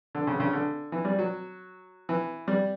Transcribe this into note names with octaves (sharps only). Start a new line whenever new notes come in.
D3
C#3
D3
C#3
D3
E3
G3
F#3
E3
G3